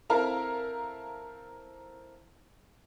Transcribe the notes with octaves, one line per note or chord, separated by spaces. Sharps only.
C4 E4 A4 A#4 F5 A#5